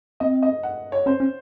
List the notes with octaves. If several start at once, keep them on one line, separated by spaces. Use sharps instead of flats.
C4 D#5
D#5
F#5
C#5
C#4 C5
C#4